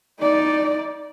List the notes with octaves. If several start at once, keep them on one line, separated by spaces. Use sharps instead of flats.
D#4 D5